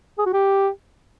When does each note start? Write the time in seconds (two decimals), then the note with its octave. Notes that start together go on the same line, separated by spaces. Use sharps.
0.18 G#4
0.26 F#4
0.33 G4